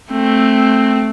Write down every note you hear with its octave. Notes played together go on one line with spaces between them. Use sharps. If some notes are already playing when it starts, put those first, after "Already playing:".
A3 C4